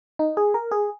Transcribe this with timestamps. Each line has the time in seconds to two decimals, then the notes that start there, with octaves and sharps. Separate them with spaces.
0.19 D#4
0.37 G#4
0.54 A#4
0.71 G#4